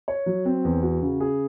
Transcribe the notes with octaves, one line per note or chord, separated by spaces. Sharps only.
C#5
F#3
C4
E2
F#4
C#3
G#4